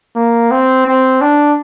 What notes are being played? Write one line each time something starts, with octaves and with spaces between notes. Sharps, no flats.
A#3
C4
C4
D4